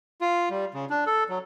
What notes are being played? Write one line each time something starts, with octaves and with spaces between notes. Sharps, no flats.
F4
G3
C#3
D4
A4
F#3